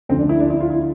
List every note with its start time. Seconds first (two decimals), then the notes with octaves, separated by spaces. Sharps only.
0.09 D2 D3 F3 C4
0.19 D4
0.29 E4
0.40 D4
0.50 E4
0.60 F4
0.70 E4